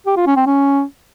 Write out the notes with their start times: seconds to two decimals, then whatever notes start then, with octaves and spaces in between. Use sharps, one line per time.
0.06 G4
0.16 F4
0.26 C#4
0.36 C4
0.46 C#4